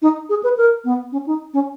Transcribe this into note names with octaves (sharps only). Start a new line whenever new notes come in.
D#4
G#4
B4
A#4
B3
C#4
D#4
C#4